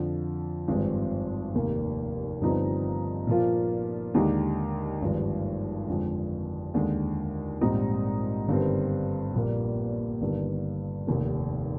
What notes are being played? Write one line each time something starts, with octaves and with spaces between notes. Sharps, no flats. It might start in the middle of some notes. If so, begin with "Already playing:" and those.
Already playing: F2 D3 F3
G#1 G2 F3 G#3 C4
F1 D#2 D#3 A#3
G1 G2 F3 C4 D#4
A#2 F3 A#3 F4
D#2 D3 G#3 D#4 G4
G#1 G2 F3 G#3
F2 D3 G#3
D#2 D3 G#3
A#1 G#2 G3 C4 D#4
G1 G2 D#3 G3 C4
A#1 A#2 G3 A#3
G1 G2 D#3
F1 D#2 D#3